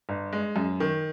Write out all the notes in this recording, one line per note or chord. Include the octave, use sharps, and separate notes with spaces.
G1
G#3
F#2
D#3